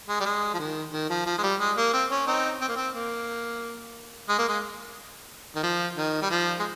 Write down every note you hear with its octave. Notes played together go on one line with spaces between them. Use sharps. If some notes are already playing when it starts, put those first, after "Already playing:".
G#3
G3
G#3
F3
D#3
D#3
F3
F3
G#3
G3
G#3
A#3
C4
C#4
C4 D#4
C4
A#3
C4
A#3
G#3
A#3
G#3
D#3
F3
D#3
G3
F3
G#3